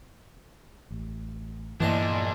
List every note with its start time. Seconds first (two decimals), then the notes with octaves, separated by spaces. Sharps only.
0.91 A1
1.80 E2 G2 A#2 E3 A#3 D4 D#5